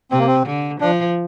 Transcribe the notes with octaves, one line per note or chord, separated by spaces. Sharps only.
C3 C4
A#3
C4
D3
F3 D4